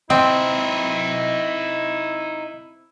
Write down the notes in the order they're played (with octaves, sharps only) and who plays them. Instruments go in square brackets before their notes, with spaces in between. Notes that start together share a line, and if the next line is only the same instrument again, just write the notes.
[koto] C4 [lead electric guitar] D#4 B4 [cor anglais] E4 [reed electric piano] D#5